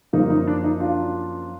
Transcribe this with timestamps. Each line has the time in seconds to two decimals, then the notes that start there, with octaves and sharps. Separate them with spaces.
0.13 F#2 F3 A#3 D#4
0.30 D#4
0.47 D4
0.64 D#4
0.80 D4 F4